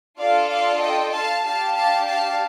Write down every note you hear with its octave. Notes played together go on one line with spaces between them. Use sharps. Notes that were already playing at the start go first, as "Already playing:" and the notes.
D4 F4 A4 D5 F5
D5 F5
D#5 G5
F5 A5
D4 G4 F5 A5
F5 A5
F5 A5